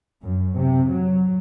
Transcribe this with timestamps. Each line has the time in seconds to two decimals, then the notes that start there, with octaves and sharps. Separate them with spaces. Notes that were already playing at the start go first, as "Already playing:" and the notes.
0.23 F#2
0.57 C3
0.91 F#3